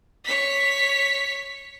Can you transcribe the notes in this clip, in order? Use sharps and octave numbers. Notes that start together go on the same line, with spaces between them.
C#5 B6